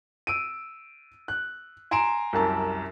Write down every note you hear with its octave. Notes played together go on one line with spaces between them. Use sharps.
E6 D7 D#7
F#6
G#5 A#5 C6 D7 E7
C2 F#2 A5